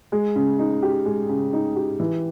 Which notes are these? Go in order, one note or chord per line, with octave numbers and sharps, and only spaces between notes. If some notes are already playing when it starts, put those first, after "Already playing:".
G#3
C#3
D#4
G4
G#3
C#3
D#4
G4
E3